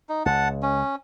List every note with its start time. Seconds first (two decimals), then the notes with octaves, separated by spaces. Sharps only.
0.09 D#4
0.26 C#2 F#5 A5
0.63 C#4